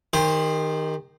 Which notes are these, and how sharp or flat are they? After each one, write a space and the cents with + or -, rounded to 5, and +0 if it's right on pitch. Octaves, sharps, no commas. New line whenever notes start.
D#3 +0 G4 +35 C5 +0